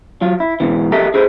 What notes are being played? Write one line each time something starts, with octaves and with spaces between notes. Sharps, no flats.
F#3 F4
E4
G#2 B2 E3
G4 A4 A#4 D#5 E5
G#4 A4 B4 C5